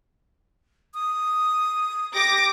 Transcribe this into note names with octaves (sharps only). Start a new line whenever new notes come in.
D#6
G4 D6 A#6